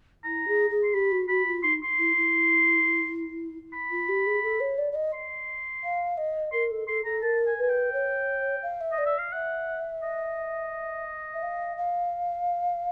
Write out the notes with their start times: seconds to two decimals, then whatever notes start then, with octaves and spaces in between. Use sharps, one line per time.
0.24 E4 A#5
0.48 G#4
0.70 G#4
0.84 C6
0.94 G4 B5
1.11 F#4
1.29 F#4 B5
1.46 F4
1.63 D#4 C6
1.84 C6
1.98 E4
2.16 E4
3.73 B5
3.91 F4
4.08 G4
4.26 G#4
4.43 A4
4.60 C#5
4.78 D5
4.92 D5
4.95 D#5
5.14 C6
5.84 F5
6.17 D#5
6.52 A#4 C6
6.71 A4
6.88 A4 C6
7.05 A4 A#5
7.22 A#4 A5
7.46 G#5
7.58 B4 G#5
7.69 G5
7.92 C#5
8.63 F5
8.81 E5
8.92 D#5
8.98 D5
9.06 E5
9.18 F5
9.32 E5 F#5
10.02 D#5
11.34 E5
11.42 F5
11.77 F5